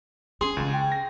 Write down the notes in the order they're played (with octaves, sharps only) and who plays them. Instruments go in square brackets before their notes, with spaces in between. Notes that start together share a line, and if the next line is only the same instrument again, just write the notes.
[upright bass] C#4 [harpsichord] G#4 [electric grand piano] C6
[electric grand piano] C#2 [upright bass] C#3 C#4
[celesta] G5
[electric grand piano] A#6